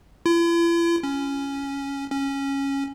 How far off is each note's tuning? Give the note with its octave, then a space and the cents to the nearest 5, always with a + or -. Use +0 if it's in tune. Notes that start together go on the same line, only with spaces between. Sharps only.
E4 +45
C#4 +0
C#4 -10